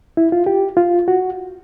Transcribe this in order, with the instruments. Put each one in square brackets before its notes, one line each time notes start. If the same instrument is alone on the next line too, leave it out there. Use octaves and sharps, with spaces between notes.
[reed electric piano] E4
F4
G4
F4
F#4